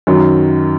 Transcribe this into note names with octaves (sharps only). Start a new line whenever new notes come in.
F#2 D#3 F#3